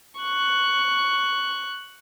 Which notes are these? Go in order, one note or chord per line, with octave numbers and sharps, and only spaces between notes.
C#6 F#6